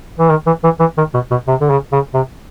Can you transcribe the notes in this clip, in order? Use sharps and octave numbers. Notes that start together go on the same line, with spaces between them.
E3
D#3
E3
E3
E3
D#3
B2
B2
C3
D3
C#3
C#3
C3